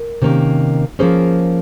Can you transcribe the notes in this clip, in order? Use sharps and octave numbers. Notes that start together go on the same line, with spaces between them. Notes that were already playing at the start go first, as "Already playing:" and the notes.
Already playing: A#4
C3 D#3 A#3 C#4
F3 A#3 C#4 G#4 C5